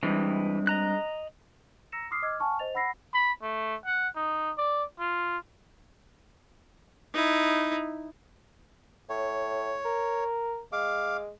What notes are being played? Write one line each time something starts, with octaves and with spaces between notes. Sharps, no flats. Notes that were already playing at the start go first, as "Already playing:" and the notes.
G2 E3 G#3 C4
D#5 A#5 F#6
A#5 E6 A#6 C#7 E7
C6 D6 D#6 F6 C7
D#5 D6 E6 F6 G#6
F#5 G#5 A5 C#6 F6
C5 D#5 A6 F7
F#5 B5 E6 A#6 C7
B5
A3
F#5
D#4
D5
F4
D#4 E4
A2 C#5
A#4
G#3 F5 D6